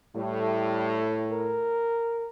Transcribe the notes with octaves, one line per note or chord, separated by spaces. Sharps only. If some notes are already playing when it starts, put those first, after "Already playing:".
A2 G3
A#4